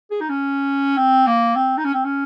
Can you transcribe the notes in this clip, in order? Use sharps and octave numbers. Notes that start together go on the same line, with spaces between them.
G#4
D#4
C#4
C4
A#3
C4
D#4
C#4
C4
C#4